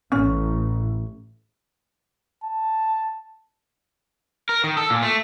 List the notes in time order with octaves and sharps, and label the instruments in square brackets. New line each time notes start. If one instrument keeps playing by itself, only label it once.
[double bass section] A1 [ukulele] C#4
[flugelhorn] A5
[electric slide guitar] A#4
D#3
A4
A#2
A3